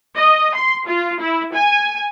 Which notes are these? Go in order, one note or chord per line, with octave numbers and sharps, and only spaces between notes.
D#5
C6
F4
E4
G#5